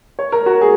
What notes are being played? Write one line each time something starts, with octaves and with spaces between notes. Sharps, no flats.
C#5
A#4
F#4
G#4